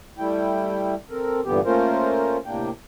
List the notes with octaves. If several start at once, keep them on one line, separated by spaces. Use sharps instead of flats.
G3 A3 E4 G5
C4 A4 A#4
G2 A#2 D3 E3 B3 G4
A3 A#3 C#4 F4 A#4 C5
A2 C3 A#3 D4 G5